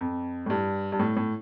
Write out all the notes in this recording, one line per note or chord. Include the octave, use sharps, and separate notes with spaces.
F2
A2
G2
G2
A2
A2